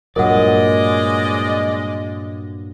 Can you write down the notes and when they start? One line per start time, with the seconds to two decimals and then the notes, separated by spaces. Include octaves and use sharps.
0.16 G2 A#2 F#3 G#3 A#4 D5 D#5 F#5